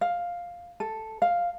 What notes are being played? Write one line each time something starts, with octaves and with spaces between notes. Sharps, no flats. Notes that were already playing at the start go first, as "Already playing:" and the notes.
F5
A4
F5